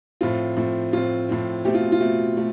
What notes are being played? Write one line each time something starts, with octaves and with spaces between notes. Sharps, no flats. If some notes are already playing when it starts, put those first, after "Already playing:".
A2 F3 C4 F4
A2 F3 C4
A2 F3 C4 F4
A2 F3 C4
B2 A3 C4 G4
F4
F4
B2 A3 C4
B2 A3